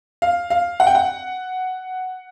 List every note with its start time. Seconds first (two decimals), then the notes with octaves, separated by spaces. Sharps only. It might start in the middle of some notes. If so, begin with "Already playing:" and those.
0.22 F5
0.50 F5
0.80 F#5
0.87 G5
0.95 F#5